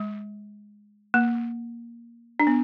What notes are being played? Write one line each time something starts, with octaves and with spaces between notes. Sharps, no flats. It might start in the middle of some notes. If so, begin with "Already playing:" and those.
Already playing: G#3
A#3
D4
B3